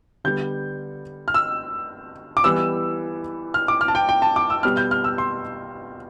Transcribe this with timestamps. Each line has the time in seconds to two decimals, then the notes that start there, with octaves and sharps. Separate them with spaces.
0.24 D3 G3 B3 G6
1.28 F6
1.34 E6
2.37 D6
2.44 E3 G3 B3 E6
3.54 F6
3.68 D6
3.81 F6
3.88 A5
3.95 G5
4.09 G5
4.22 A5
4.36 D6
4.50 E6
4.63 B2 G3 B3 F6
4.77 G6
4.91 F6
5.04 E6
5.18 C6